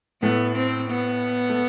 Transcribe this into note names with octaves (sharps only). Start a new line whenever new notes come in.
A2 A3 B3
C4
B3
A3